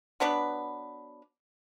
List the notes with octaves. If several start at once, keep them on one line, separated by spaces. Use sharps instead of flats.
F#3 B3 D4 B4